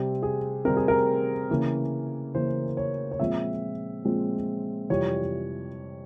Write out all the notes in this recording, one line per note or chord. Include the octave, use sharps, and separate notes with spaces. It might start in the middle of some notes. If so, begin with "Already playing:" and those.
Already playing: C3 G3 C4
G#4
C3 G3 C4 A#4
G#4
A#4
C#3 E3 A#3 C#4
C#3 E3 A#3 C#4 C5
C#5
C#5
A#2 F3 G#3 C4 E5
A#2 F3 G#3 C4
F2 C3 E3 G3 C#5